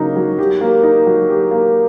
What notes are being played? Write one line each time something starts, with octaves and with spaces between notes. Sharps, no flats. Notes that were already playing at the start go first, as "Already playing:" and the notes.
Already playing: C#3 F#3 A#3 D#4
F#3
G4
A#3
D#4
F#3
G4
A#3